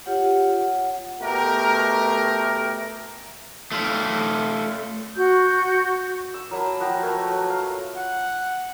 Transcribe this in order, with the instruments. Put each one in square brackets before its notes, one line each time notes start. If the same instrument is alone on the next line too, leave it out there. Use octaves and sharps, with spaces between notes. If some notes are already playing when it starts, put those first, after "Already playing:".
[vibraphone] F4 G4 C#5 F#5
F#5
[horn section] B2 A3 G4 A#4
[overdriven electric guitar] A3 F4
[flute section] F#4 G6
[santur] E6
F#3 A#3 A5 B5
F3 F#4 G5 A#5
A3 A#4 B4 C#5
F#3
F5
[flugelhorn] F#5